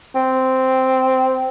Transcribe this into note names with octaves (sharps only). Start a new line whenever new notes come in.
C4